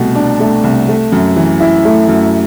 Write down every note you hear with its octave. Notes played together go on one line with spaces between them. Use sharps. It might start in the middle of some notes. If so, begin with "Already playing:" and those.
Already playing: C2 B2 A3
D4
A3
C2
A3
F#2
E3
E4
A3
F#2